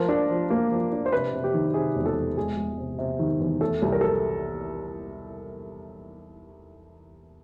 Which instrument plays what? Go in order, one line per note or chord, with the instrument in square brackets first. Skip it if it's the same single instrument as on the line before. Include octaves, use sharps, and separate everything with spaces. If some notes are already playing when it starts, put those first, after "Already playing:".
Already playing: [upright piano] F3 A#4
D4
F3
A#3
F3
D4
C5
C3 B4
C3
G4
D#3
C3 G#4
E1
A4
E1
G#3 G#4
G#3
C3
C3
D#3
E2
A3 A4
C2
A#4
A4